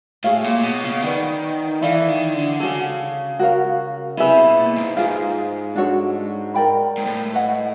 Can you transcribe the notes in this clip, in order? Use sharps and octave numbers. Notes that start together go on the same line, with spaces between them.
A2 G#4 C#5 F5
A#2
B2
C#3
D#3 B4 D5 F#5
E3 E4 A4 D5 F5
D#3
D3
C#3 C#4 F#4 A4
F#4 A#4 C#5 F5
C3 E4 G#4 B4 E5
B2
A#2
G#2
G#2 F4 G#4 C5 F5
D4 F#4 A4 C#5
A#4 D5 G5 B5
G#2
A2
B4 D#5 F#5